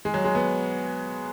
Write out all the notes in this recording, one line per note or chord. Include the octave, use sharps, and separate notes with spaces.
G#3
F#3
G#3
B3